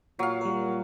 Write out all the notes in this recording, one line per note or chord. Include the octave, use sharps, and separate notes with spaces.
A#2 F#3 F5
G3 A#4